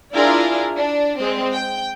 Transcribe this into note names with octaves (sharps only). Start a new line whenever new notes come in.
D4 E4 F4 G#4 A#4 D5
D4 D5
G#3 C4
G5